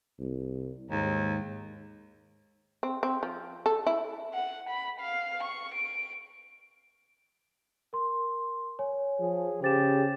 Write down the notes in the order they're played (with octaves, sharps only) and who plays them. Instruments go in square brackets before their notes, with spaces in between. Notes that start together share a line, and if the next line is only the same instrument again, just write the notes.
[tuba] C2
[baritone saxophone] D#2 [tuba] G#2
[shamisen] C4
C4
F3
A4
E4
[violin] F#5
B5
F5
C#6
D7
[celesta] A#4 C6
C#5 G#5
[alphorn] F3 [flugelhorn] G#4
[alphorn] C#3 [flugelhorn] G4 [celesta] C5 A6 E7